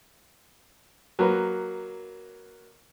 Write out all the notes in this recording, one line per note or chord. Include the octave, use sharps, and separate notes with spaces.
F#3 A#3 B4